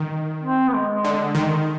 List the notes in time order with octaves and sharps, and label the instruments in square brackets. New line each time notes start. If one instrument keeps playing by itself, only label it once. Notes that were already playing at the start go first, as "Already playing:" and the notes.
Already playing: [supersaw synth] D#3
[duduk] C4
B3
G#3
[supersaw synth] D3
D#3